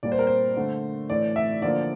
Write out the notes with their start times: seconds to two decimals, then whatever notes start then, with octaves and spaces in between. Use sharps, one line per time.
0.03 A#2 G3 A#3 D5
0.12 C5
0.19 A#4
0.27 C5
0.57 D3 A3
1.10 A2 E3 A3 D5
1.36 E5
1.62 D3 F3 A#3 D5